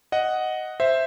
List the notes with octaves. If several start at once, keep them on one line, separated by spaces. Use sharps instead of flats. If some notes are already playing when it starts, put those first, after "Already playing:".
D#5 F#5
C5 E5